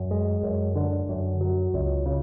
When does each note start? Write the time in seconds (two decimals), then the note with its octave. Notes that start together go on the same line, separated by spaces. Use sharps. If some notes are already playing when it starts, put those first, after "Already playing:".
Already playing: F#2
0.11 G#3
0.43 F#2
0.75 D3
1.09 F#2
1.41 F#3
1.74 C#2
2.06 C#3